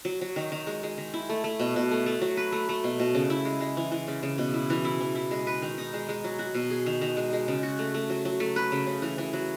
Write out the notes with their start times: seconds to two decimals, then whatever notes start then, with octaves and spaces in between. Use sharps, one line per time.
0.05 F#3
0.21 F#3
0.36 D#3
0.52 D#3
0.67 G#3
0.83 G#3
0.98 D#3
1.14 E4
1.29 A3
1.44 A3
1.59 B2
1.76 B2
1.91 A3
2.06 A3
2.21 F#3
2.37 B4
2.52 A3
2.69 A3
2.84 B2
3.00 B2
3.15 C#3
3.30 E4
3.45 G#3
3.61 G#3
3.77 E3
3.92 E3
4.07 C#3
4.23 C#3
4.38 B2
4.54 E4
4.70 E3
4.85 E4
5.01 E3
5.15 E4
5.31 G#3
5.47 B4
5.62 D#3
5.78 D#4
5.94 G#3
6.09 G#3
6.24 F#3
6.39 F#4
6.54 B2
6.70 G#4
6.86 D#3
7.01 D#3
7.17 G#3
7.33 G#3
7.48 C#3
7.63 F#4
7.79 A3
7.94 A3
8.10 F#3
8.25 F#3
8.40 A3
8.56 B4
8.72 C#3
8.87 C#3
9.02 E3
9.18 E3
9.33 F#3